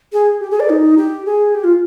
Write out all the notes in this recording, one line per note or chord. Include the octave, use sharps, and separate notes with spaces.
G#4
G4
G#4
D5
D#4
G4
G#4
G4
F4